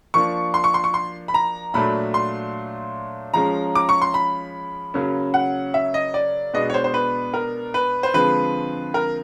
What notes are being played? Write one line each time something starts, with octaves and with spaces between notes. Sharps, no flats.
F3 A#3 D4 C#6
C6
C#6
C6
C#6
C6
B5
A#5
A#2 F#3 A3 D4 B5
C6
F3 G#3 C#4 A#5
D6
C#6
C6
B5
C#3 F#3 A#3 C#4
F#5
E5
D#5
D5
B2 G#3 B3 D4 D#5
C#5
C5
C5
B4
A#4
B4
C5
D3 F3 G#3 C4 B4
A#4